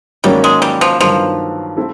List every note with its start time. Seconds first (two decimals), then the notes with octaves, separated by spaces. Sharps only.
0.24 G#2 D#3 F#3 G3 A#3 C#4
0.44 G#3
0.62 G3
0.81 F3
1.00 G2 D#3 F3 F#3 B3
1.77 C4 E4 A4